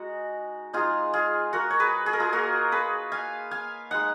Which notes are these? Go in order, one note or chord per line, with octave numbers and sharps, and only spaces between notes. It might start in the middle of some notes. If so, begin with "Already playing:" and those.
Already playing: G#3 D#4 F#4
G#3 D#4 F4 G#4
F4 G#4
F#4 A#4
C#5
G#4 B4
G#4
A#4
F4 G#4
A#3 F4 F#4 A#4
G#4 B4
F5 G#5
F5 G#5
G#3 D#4 F#5